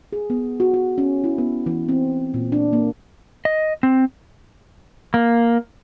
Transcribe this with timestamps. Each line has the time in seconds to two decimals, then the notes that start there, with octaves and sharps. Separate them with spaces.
0.13 G#4
0.30 B3
0.60 F#4
0.74 F#4
0.98 C#4
1.24 E4
1.38 B3
1.66 E3
1.89 C4
2.34 A#2
2.52 D4
2.73 A#3
3.45 D#5
3.83 C4
5.14 A#3